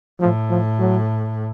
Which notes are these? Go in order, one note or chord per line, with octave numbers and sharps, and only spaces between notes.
A2 F3
F3
F#3